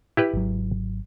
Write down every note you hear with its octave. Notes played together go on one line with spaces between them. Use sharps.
E4 G4 B4
G#1 F#3